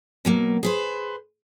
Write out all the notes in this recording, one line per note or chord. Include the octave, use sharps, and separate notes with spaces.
B2 F#3 A#3
G#4 B4 C5